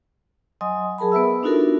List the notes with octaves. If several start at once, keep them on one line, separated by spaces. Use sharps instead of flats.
F#3 D#5 G#5 C6 D#6
F#3 G#4 A#4 A5 B5
B3 B4 E5 E6
D4 D#4 F4 F#4 A4 A#4